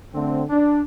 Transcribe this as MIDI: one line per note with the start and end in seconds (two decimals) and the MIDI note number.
0.14 0.43 50
0.14 0.43 57
0.14 0.43 60
0.49 0.81 62